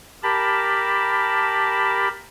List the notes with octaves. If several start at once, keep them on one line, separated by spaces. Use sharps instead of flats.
G4 A#4 A5 B5